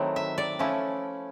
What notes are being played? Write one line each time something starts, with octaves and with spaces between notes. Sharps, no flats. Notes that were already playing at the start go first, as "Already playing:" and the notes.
Already playing: D#3 F#3 A3 C4 E4
E5
D5
F3 A3 C#4 E4